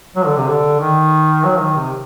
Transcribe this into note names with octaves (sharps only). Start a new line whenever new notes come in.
F#3
D3
C3
D3
D#3
F#3
D#3
C3